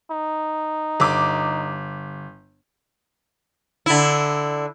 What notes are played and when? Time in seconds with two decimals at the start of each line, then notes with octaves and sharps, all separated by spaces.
0.11 D#4
1.00 G1 D6
3.86 D3 E4